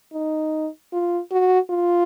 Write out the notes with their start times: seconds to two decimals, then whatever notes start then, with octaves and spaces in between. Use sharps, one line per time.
0.13 D#4
0.92 F4
1.31 F#4
1.70 F4